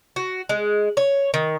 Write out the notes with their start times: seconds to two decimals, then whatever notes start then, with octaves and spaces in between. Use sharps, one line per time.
0.16 F#4
0.49 G#3
0.97 C#5
1.34 D#3